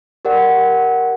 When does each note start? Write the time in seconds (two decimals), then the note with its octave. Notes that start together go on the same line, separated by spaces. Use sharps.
0.25 G4 A#4 D5 F#5